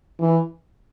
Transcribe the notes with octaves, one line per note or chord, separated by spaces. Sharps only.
E3